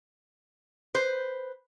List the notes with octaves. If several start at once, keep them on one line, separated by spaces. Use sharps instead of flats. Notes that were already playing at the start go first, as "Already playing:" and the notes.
B4 C5